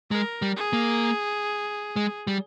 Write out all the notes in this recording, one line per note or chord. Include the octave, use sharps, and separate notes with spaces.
G#3 A#4
G3
G#4
A#3
G#3
G3